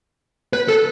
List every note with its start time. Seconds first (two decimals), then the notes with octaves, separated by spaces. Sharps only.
0.53 B4
0.68 A4